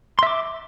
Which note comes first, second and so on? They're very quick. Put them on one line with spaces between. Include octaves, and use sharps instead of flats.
C6 E5 D6